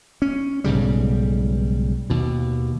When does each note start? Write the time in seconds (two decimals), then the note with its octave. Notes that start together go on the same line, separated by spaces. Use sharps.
0.22 C#4
0.64 B1 G#2 C#3 G3
2.10 D#2 B2